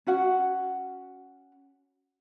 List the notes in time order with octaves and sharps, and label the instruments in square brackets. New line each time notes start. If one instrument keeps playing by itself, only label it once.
[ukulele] C#4 F#4 F#5